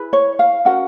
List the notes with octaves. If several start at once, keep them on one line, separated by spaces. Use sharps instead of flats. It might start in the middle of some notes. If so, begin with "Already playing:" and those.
Already playing: E4 G#4 B4
C#5
F5
C#4 F#4 A#4 F#5